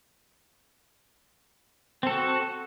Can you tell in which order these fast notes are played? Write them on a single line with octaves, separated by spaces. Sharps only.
C4 A4 F#4